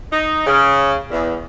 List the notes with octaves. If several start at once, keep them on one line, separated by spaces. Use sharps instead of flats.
D#4
C#3
E2